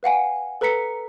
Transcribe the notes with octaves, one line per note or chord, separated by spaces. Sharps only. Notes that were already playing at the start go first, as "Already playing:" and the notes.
B4 F5 F#5 G#5
A4 B4 A#5 B6 C#7